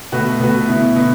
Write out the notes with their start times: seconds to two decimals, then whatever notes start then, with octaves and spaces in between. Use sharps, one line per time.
0.12 B2 A3 F#4 B4
0.39 B2 A3 F#4 B4
0.68 B2 B3 E4
0.96 B2 B3 E4